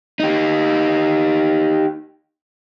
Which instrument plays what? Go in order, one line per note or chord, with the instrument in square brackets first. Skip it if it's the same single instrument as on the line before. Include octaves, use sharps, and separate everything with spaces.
[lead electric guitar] D#4 G4